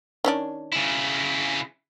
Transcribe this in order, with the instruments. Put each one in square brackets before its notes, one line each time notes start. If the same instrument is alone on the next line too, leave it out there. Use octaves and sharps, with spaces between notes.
[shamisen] D#3 C#4 D4
[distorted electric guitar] C#3 E4